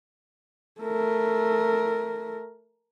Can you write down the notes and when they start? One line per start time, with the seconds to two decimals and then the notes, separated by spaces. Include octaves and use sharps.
0.81 A3 A#4